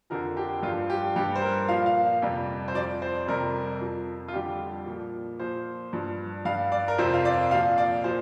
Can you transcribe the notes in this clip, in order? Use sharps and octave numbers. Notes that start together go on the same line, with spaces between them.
F2 D3 F3 A#4
G4
G2 F4
F3
G4
G2 G3 G4
C5
A#4
A#2 F3 F5
F5
F2 C3 G3
C5
F2 F3 D5
C5
F2 C3 G3 A#4
F2 F3
F4
F2 D3 G3 G4
A#2 F3
A#2 F3 C5
G2 F3
G2 G3 F5
D5
A#4
F2 C3 F3 C5
F5
D5
A#2 F3 F5
D5
A#2 F3 C5